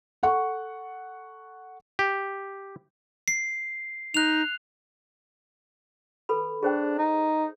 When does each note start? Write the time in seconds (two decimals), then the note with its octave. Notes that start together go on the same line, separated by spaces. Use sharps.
0.23 A4 F#5 C#6
1.99 G4
3.28 C7
4.14 D#4 F#6 F7
6.29 A4 B4 B5
6.63 D4 G#4 C5 G5
6.98 D#4